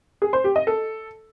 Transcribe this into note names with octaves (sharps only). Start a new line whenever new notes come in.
G#4
C5
G4
D#5
A4